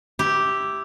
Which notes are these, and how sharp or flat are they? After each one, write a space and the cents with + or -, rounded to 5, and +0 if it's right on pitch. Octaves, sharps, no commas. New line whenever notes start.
E4 +0 G4 -5